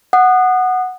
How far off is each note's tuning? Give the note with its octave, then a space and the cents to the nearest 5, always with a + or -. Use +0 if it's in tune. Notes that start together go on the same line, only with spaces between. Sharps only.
F#5 +0 D#6 -25